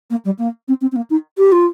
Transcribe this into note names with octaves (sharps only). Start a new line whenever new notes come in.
A#3
G3
A#3
C4
C4
C4
A#3
D#4
G4
F4